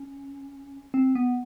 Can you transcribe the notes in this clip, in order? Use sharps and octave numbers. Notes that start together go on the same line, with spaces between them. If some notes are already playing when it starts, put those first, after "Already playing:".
Already playing: C#4
C4
B3